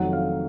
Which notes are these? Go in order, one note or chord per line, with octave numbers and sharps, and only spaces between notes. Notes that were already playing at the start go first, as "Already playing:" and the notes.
Already playing: F1 F2 D#3 F#3 F#5
F5